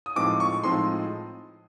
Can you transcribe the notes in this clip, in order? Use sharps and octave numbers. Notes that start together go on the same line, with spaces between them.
D#6
A2 F3 G#3 C4 D#4 D6
C#6
A2 F3 G#3 C4 D#4 C6